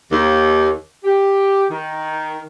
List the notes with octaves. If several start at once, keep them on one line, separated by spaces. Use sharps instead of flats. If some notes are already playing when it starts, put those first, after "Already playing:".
D#2
G4
D#3